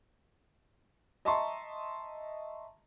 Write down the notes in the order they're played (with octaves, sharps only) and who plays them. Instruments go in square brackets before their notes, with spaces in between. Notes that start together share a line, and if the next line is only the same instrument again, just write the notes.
[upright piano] D#5 E5 A5 A#5 C6 C#6